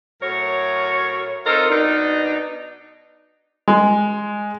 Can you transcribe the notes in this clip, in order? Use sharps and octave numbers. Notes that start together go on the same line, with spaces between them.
A2 F#3 A#4 C#5
C4 D#4 F4 A4 A#4
B2 D4 D#4
G#3